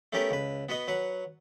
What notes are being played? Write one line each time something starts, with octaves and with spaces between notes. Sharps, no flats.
A3 B3 C#4 G4 A#4 B4
C#2 B4
B3 F#4 B4 D#5
F#3 B4 F#5